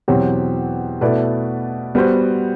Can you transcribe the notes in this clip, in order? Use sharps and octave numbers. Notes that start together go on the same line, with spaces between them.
E2 B2 F#3 C4 G4
B2 A3 E4 B4 D5
G3 B3 F#4 C5